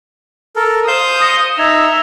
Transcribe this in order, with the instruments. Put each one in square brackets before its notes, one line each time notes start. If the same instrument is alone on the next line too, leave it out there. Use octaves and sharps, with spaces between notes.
[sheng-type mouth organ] A4 A#4
[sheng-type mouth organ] C5 F5 G6 [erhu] D#6 [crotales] C7 E7 G7
[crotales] A#6 C#7 G7
[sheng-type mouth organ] D#4 [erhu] E5 [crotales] E6 G#6 F7